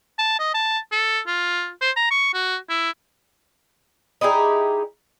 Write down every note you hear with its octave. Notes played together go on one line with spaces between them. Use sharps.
A5
D#5
A5
A4
F4
C5
A#5
C#6
F#4
E4
D#4 E4 G4 G#4